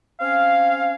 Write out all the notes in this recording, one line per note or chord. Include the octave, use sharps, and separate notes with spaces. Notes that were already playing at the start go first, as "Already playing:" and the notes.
C4 C#4 F5